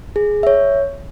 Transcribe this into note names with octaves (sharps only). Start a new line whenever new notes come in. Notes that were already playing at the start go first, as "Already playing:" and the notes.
G#4
C#5 E5